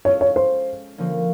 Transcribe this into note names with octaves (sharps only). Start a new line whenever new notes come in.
G#3 C#4 F4 A4 C#5
C#5
C5
D3 F3 A#3 C#4